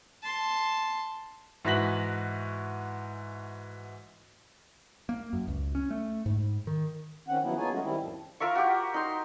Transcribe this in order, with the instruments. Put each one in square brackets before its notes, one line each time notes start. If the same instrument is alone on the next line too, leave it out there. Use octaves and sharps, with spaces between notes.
[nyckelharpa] A5 C6
[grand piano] G#2 E3 F#4 A#6 B6 F#7
[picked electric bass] A#3
F#2
C#2
C#4
A3
G#2
D#3
[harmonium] D#3 C4 C#4 F#5
D#3 F3 F#3 A#3 B3 E4
B3 D#4 F4 G#4 C#5 G#5
F#3 G#3 A3 C#4 F#4
D#3 G3 C4 E4
F2 A2 F3
[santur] F4 A#4 E5 C#6
F#4 G4
D#4 C6